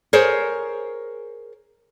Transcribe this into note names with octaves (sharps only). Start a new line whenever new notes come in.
G#4 A#4 C5 C#5